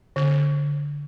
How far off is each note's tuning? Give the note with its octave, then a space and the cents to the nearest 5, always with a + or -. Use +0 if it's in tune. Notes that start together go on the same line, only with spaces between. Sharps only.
D3 -15